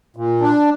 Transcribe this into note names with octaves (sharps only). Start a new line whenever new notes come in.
A#2
D4